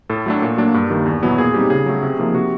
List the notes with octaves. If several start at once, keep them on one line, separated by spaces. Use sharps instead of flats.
A2 A4
F#3 A3 D4
A#2
F#3 A#3 D4
G2
D#3 G3 A#3
E2
B2 F#3 B3 E4
A#2 G#4
G3 C4 D#4 G4
C#3 G#4
F#3 A3
C3
F3 A#3 D#4
C3 F#4